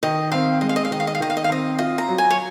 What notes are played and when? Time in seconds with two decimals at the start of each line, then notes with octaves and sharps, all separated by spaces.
0.03 D#3 D#5
0.32 C4 F5
0.61 G#3 D#5
0.69 F5
0.76 D#5
0.85 F5
0.91 D#3 D#5
1.00 F5
1.07 D#5
1.15 F5
1.20 D#3 D#5
1.30 F5
1.37 D#5
1.44 F5
1.50 C4 D#5
1.79 F4 D#5
1.98 A#5
2.09 F#3
2.18 G#5
2.30 C#5